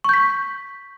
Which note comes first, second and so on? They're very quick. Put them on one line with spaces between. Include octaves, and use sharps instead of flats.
C#6 G6 B6